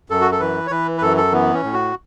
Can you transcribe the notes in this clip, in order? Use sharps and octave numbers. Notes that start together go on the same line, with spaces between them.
F#2 A4
F#4
A4
E3 B4
C#5
E3 B4
B4
F#2 A4
A4
E3 B3
C#4
A2
F#4